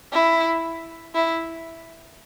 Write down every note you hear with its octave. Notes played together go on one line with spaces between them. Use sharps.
E4
E4